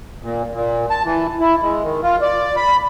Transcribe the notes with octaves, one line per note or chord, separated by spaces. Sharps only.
A#2
A#2
A5
E3
E4
G#3
D#3
F4
D5
B5